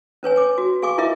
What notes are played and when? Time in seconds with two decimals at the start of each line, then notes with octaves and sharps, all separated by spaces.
0.23 C#4 B4 C#5 G#5
0.36 G#5 D6
0.58 F#4
0.82 G#4 F5 G#5 C#6 D6
0.98 E4 F4 A#4 D#5 E5